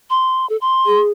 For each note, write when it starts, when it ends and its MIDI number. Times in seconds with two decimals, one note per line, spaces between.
0.10 0.48 84
0.49 0.57 69
0.61 1.00 84
0.86 1.09 68